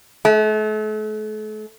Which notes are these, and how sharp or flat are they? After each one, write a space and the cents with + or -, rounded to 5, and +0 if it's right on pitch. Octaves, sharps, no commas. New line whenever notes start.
A3 -40